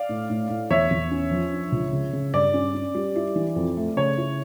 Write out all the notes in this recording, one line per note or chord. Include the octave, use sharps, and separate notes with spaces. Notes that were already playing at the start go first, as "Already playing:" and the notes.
Already playing: D5 F5
A2
A2
A2
E2 C#5 E5
E2
C#4
F3
D4
C#2
C#3
C#3
G2 D5
C#4
C#4
G3
E4
E3
F2
A3
C#3 C#5
E4